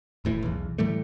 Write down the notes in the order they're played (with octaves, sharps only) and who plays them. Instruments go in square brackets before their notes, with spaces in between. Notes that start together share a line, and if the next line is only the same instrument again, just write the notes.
[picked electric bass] E1 A2 E3
B1 E2
A2 E3 G3 A3